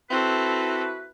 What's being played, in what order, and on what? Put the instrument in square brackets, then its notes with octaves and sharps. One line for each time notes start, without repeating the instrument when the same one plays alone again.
[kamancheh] C4 A4 [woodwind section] E4 F#4 B4